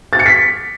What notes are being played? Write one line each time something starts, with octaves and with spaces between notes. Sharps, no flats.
A6
C#7
B6